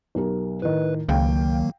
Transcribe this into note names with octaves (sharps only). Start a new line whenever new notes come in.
B1 G4 A#4
A2 D#3 B4
C#2 D#3 F#3 A#3 F5 G5